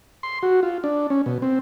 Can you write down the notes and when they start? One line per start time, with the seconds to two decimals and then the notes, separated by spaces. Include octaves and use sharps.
0.23 C6
0.43 F#4
0.63 F4
0.84 D4
1.10 C#4
1.26 B2
1.42 C4